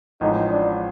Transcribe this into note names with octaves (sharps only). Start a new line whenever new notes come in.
A1 A2 F3 G#3 D#4
D4